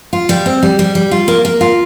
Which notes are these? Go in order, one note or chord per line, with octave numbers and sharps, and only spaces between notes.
F4
G3
C4
G3
G3
G3
F4
A#3
A#3
F4